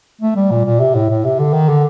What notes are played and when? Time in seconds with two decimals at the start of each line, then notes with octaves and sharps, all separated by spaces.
0.21 A3
0.36 G3
0.51 A#2
0.66 A#2
0.80 C3
0.95 A2
1.10 A2
1.24 C3
1.39 D3
1.53 D#3
1.68 D3